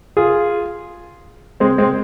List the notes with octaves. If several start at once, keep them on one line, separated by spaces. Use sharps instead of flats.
F4 G#4
G#3 C4
G#3 C4